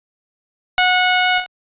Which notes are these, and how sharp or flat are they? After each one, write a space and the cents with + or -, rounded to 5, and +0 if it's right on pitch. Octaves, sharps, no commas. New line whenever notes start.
F#5 -20